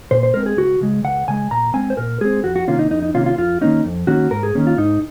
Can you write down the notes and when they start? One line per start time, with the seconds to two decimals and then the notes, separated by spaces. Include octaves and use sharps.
0.11 A#2 C5
0.23 C5
0.34 G#3 C4 A#4
0.46 G#4
0.57 C#2 F#4
0.81 C#3 G#3
1.04 C#2 F#5
1.28 C#3 G#3 G#5
1.51 A#2 A#5
1.74 G#3 C4 G#5
1.90 C5
1.97 A#2 A#4
2.21 G#3 C4 G#4
2.44 F2 F#4
2.56 F#4
2.68 C3 D#3 A#3 C#4 F4
2.79 D#4
2.91 F2 D#4
3.03 D#4
3.14 C3 D#3 A#3 C#4 F4
3.26 F4
3.38 F2 F4
3.61 D#3 A#3 C#4 D#4
3.85 F2
4.07 D#3 A#3 C#4 F#4
4.31 G#2 A#4
4.43 G#4
4.55 D#3 A#3 C#4
4.67 F4
4.78 G#2 D#4